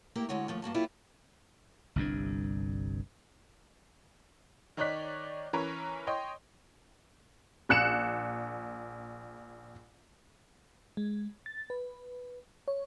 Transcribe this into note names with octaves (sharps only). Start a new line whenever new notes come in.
A#3 E4 G4 A#4
D2 D3 G#3 F#4 C#5
D#2 G#2 F3 A3 C#5
G2 A#3 F#4 A5
F#3 A#3 E4 F4 G4
G1 C2 G2 D4
D#3 D#4 C#5 D5 F#6 B6
E3 C#4 A#4 B4 C#5
C#5 D#5 G5 C6
A#1 F#6 C#7 E7
G#3
A6
B4
C#5